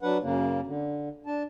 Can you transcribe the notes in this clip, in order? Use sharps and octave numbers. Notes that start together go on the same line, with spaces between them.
F#3 D4 B4 F#5
F#2 C#3 A#3
D3
D4 A5